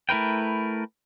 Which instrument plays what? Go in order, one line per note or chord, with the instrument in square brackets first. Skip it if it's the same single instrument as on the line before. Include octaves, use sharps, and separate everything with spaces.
[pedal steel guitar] A3 E4 A#4 B4 G5